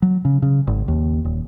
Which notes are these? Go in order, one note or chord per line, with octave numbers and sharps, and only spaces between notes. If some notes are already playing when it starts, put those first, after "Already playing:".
F#3
C#3
C#3
G#1
D#2
D#1